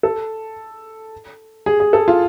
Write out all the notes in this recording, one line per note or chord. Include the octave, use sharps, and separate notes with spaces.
A4
G#4
G#4
A4
F4